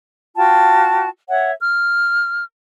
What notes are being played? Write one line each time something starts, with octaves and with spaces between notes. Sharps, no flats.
F4 F#4 G5 A5
C#5 E5 F#5
F6